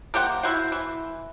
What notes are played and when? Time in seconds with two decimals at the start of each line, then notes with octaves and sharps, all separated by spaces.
0.14 A#3 G4 C5 F#5
0.43 E4 F#4 C5
0.72 E3